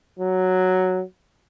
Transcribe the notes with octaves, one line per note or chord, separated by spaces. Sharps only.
F#3